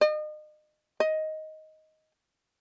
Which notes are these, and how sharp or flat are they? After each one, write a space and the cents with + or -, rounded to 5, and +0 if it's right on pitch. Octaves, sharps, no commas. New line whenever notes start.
D#5 -35
D#5 +10